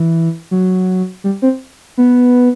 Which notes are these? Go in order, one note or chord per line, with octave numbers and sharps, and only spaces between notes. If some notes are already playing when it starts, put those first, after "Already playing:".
Already playing: E3
F#3
G3
C4
B3